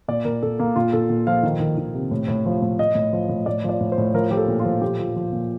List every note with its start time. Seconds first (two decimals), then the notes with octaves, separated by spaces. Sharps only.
0.08 A#2 D5
0.25 A#2 A#4
0.43 A#2 A4
0.59 A#2 A#3
0.76 A#2 F4
0.93 A#2 A4
1.10 A#2
1.27 F3 F5
1.43 D#3
1.60 D#3
1.78 D#3
1.94 C3
2.11 A2
2.28 A2
2.46 F3
2.62 A2
2.79 A2 D#5
2.95 A2
3.13 F3
3.29 A2
3.46 A2 D5
3.64 F3
3.69 D5
3.81 A2
3.92 C5
3.98 A2
4.14 F3 A#4
4.31 F3 G4
4.37 A4
4.48 A#2
4.60 F4
4.65 F3
4.81 A#2 G4
4.99 F3
5.16 F3
5.33 A#2